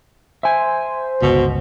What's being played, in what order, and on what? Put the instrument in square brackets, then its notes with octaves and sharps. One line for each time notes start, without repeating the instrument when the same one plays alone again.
[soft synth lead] C5 [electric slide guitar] E5 G#5
[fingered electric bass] G1 C#2 [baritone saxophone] B2